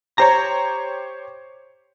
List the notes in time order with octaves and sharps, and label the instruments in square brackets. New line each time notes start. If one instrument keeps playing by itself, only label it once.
[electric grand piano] G4 C5 C#5 [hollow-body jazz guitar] A#5